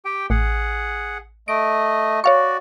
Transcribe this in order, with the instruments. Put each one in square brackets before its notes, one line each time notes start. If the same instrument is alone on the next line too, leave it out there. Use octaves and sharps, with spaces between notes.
[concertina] G4 G5
[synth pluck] A1 [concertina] G#4 F#5
[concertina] A3 D#5 [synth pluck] D7
[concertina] F#4 D5 [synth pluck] C#5 F5 C#6